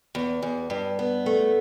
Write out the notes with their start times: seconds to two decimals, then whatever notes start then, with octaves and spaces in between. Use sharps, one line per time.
0.15 E2
0.42 E2
0.70 G2
0.99 B3
1.26 A3